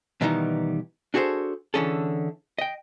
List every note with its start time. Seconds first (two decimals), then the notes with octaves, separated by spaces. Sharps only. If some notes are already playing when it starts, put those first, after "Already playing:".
0.21 B2 D#3 E3 G3 B3 D#4
1.14 D4 F#4 G#4 A4 C5
1.74 D3 E3 C#4 G#4 A4
2.59 D#5 G5